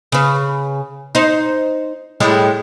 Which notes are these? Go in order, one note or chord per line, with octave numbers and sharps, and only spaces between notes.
C#3 B4
D#4 C5
A2 G3 G#3